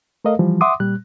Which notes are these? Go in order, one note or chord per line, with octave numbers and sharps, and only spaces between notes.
A3 A4 A#4 D#5 F5
E3 F3 G3
E5 F#5 C6 D6 D#6
A#2 G3 F#6